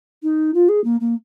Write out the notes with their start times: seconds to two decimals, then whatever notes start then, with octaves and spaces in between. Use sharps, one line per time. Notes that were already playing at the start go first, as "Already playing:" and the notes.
0.23 D#4
0.54 F4
0.68 G#4
0.84 A#3
1.00 A#3